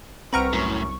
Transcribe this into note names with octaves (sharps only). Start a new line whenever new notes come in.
C2 C4 B4 F#5 A#5 C#6 F6 D7
F#2 A2